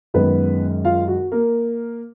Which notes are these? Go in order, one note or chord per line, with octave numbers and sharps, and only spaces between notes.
F#2 D#3 G#3 B3 B4
F4 F5
F#4
A#3 A#4